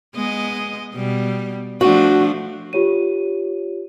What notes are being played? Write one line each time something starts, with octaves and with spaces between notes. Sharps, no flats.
G#3 B3 D#5
B2 G3
F3 A3 D4 F#4
F4 G4 C#5 D#7